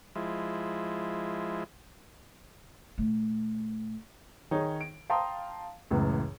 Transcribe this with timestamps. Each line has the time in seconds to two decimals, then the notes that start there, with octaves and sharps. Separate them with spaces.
0.15 F3 G#3 E4
2.98 A#2 A3
4.51 D#3 D#4 G#4 C#5
4.81 D7
5.10 F5 G5 A5 A#5 C6 D#6
5.91 C#2 F#2 A2 E3